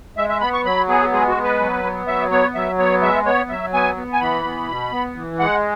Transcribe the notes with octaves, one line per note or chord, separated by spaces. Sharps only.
G#3 E5
E5
B3 B5
C#6
F#3 B5
B3 G#4
G#3 G#4
F#4
B3
B4
F#3
B3
F#3 E5
B3 C#5
F#3 E5
B3 C#5
G#3 E5
B3 C#5
F#3 E5
B3 G#5
B3
G#5
E3 B5
B3
B2
B3
E3
G#3 F#5